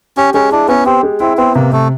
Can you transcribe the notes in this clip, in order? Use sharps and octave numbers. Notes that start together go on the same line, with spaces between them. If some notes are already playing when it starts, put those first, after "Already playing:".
C#4 G4
G#3 C#4
D4 E4
B3 C#4
C4 G4
G#3
C4 E4
B3 C4
C3 A#3
C3 A3